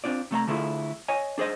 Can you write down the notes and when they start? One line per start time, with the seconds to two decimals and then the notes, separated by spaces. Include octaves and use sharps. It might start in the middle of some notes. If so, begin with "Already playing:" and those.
0.04 C4 D4 F4 D5
0.31 C3 A3 E5 A#5
0.47 D3 A3 E4 F4 G#4
1.08 C#5 D#5 G#5
1.38 D4 G#4 C5 D#5